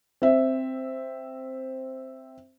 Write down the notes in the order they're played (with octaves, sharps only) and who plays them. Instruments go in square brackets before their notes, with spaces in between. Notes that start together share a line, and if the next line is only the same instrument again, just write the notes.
[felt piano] C4 E5